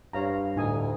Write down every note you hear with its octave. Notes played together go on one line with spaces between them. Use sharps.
G2 C#5 F5 A#5
D2 A2 D#4 G#5 D#6